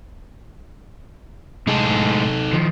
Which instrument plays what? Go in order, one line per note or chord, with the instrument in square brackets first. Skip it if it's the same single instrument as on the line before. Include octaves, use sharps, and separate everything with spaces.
[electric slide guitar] A2 G#3 G#4 [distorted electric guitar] D#4 A4
[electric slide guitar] D#3 F3